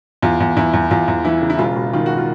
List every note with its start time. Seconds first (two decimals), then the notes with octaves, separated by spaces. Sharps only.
0.22 E2 F4
0.40 E2
0.57 E2 E4
0.73 E2
0.90 E2 F4
1.08 E2
1.25 E3 E4
1.41 C#3
1.50 E4
1.58 E1 F4
1.76 E1
1.93 D#3 F4
2.06 F#4
2.18 F4